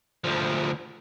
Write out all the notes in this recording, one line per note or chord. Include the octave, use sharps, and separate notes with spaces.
D2 F3